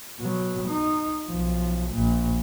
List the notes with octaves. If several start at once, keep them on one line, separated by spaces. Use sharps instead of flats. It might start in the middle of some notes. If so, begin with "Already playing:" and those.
B2 F#3
D#4
B1 F3
A#1 A#2